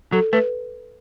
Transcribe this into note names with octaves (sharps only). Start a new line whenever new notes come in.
F#3 A4
A3 B4